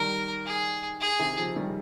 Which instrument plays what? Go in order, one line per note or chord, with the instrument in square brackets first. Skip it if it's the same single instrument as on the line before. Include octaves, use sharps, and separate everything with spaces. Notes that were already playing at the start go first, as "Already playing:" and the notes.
Already playing: [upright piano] D#3 G3 [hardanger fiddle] A#4
[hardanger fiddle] G#4
G#4
[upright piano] C3 D#3
C#3 F3
D#3 G3